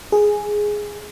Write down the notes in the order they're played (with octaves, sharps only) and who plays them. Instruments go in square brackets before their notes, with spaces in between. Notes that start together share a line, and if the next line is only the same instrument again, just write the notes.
[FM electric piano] G#4